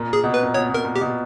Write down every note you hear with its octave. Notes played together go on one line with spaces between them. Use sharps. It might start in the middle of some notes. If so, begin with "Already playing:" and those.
Already playing: A#2
G#4
B2
B4
A#2
B2 C#5
B2
A#4
A#2
G4
B2